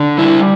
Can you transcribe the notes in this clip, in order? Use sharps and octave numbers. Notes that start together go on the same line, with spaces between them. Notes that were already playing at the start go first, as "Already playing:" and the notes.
Already playing: D3
G3 E4